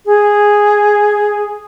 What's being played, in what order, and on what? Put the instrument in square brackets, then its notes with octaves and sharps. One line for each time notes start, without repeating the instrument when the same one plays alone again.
[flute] G#4